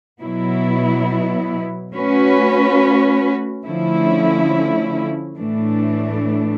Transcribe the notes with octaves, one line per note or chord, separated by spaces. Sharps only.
B2 F#3 B3 E4
A3 C#4 F#4 B4
D3 F3 A3 C#4 E4
A2 E3 A3 D4